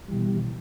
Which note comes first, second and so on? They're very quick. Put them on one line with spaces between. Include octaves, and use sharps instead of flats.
G3 E3 B2